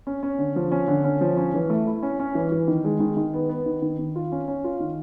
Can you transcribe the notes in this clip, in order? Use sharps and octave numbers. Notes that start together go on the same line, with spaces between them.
C#4
C#4
D3
F3
C#4
D3
C#4
F3
C#4
E3
A3
E4
C#4
C#4
E3
E3
D#3
G#3
D#3
D#3
B3
B3
D#3
D#3
D#3
F4
C#4
C#4
F4
D#3